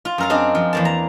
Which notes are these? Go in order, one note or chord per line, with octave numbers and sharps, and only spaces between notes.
F4
F#2 A#4 F5
C4 D4 G#4 D#5
F3
E2 A#3 A5
A#5